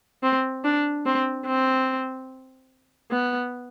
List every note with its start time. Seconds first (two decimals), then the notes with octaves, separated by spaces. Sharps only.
0.23 C4
0.64 D4
1.06 C4
1.47 C4
3.12 B3